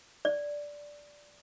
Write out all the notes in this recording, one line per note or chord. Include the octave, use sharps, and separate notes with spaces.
D5